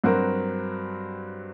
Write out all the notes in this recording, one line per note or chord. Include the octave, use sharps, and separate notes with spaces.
G2 F#3 C4 F#4 A#4